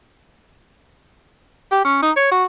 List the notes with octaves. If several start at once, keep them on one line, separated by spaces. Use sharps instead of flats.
G4
C#4
D#4
C#5
F#4